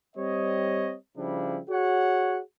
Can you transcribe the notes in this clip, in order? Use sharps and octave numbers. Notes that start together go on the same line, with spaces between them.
G3 C4 C#5 D#5
C#3 F3 G3 D4 E4
F#4 G#4 C#5 F#5